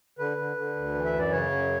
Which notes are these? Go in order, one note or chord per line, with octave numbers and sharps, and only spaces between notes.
D3 B4
D3
D3
D2
E3
E5
F#2
D5
C#3 C#5
F#2